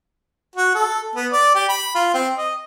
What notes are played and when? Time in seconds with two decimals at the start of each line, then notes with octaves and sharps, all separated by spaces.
0.56 F#4
0.75 A4
1.16 B3
1.32 D5
1.55 G4
1.69 B5
1.95 F4
2.14 C4
2.38 D#5